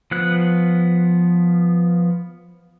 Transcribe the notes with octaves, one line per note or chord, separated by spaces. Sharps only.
F3 B3 F#6